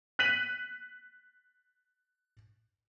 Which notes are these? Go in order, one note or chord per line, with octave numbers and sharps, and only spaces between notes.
F#6 B6 D#7 F#7